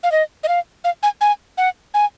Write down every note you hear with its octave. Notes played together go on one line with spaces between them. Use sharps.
F5
D#5
D#5
F5
F5
G#5
G#5
F#5
G#5